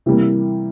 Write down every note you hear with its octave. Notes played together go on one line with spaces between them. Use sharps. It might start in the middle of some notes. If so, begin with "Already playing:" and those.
C3 E3 G3 A#3